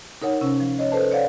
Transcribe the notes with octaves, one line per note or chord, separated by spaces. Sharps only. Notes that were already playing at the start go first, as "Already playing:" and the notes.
D#4 A#4 C#5 F#5
C3 C#4
F3
C#5 D#5
A4 B4 C5 A5
C#5 D5 F5 F#5